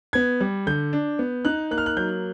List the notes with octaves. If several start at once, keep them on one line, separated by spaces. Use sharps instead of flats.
B3 G#6
G3
D3 G6
D4
B3
D#4 F#6
A#3 F#6
F6
F#6
F#3 G6